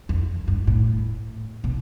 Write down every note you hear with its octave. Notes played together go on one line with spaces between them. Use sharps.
F2
G2
A2
B2